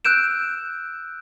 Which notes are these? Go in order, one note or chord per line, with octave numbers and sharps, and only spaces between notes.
E6 F#6 G6 D7 E7